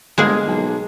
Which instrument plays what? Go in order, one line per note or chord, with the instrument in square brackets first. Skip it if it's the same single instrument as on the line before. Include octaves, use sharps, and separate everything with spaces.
[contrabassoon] G1 [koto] G#3 A#3 G#4
[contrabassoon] B1